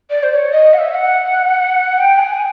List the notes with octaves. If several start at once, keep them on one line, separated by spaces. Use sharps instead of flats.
D5
C5
D5
C#5
D#5
F#5
E5
F#5
G5
G#5